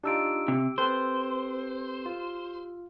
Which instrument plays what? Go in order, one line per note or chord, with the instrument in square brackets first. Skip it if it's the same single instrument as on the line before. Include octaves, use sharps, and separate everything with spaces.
[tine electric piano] D4 D#4 F4 [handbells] G4 E6 D7
[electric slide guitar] C3
[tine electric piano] C4 A4 B4 [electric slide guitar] C5
[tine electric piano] F4